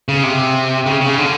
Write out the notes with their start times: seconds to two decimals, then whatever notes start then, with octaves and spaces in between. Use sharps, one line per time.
0.09 C#3
0.23 C3
0.86 C#3
1.01 C#3
1.18 D3